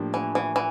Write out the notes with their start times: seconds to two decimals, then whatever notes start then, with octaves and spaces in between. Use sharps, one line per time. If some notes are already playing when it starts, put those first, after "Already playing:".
Already playing: A2 F3 A#3 D4 G4
0.14 E3
0.35 E3
0.56 E3